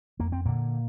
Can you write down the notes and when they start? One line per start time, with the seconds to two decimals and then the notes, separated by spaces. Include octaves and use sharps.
0.19 F2 A#3
0.32 C4
0.45 A#2 D3 A#3